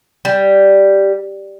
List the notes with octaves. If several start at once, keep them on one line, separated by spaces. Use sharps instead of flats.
G3